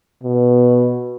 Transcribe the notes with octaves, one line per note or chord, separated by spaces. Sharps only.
B2